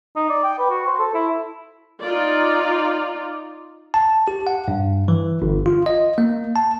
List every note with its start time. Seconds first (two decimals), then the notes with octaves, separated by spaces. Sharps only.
0.16 D#4
0.30 D5
0.44 G5
0.58 B4
0.70 F#4
0.87 C5
0.99 A4
1.14 E4
2.01 D#4 F4 D5
3.94 A5
4.28 G4
4.47 F#5
4.68 G2
5.08 E3
5.42 G1
5.66 F4
5.86 D#5
6.18 A#3
6.56 A5